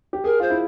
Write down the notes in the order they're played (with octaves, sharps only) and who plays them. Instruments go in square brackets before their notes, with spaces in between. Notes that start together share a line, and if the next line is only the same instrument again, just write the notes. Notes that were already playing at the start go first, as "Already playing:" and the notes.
[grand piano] G4
[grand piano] G#4 [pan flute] A#4
[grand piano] F4 [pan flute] C5
[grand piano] E4